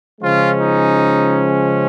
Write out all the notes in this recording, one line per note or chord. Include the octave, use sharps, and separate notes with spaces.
C#3 F3 G#3 C#4 F4
D#4